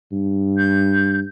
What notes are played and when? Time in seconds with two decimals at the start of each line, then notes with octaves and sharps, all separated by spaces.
0.12 G2
0.57 G6